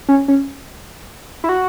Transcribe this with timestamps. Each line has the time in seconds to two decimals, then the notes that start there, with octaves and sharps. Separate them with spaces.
0.09 C#4
0.28 C#4
1.44 E4
1.49 F#4